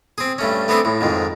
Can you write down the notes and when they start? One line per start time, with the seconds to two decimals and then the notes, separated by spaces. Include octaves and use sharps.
0.18 C4 G#4
0.38 G2 A3 C#4
0.68 A3 B3 C4 D4 G#4 A4
0.85 A2
1.01 F2 G#2 D#3